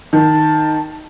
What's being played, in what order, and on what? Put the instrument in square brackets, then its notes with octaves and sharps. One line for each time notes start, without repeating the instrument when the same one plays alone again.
[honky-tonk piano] D#3 [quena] A5